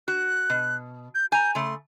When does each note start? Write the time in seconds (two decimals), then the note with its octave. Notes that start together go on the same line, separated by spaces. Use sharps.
0.08 F#4 F#6
0.50 B2
1.15 G6
1.32 G#5 A#5 G6
1.55 C#3 A3 C6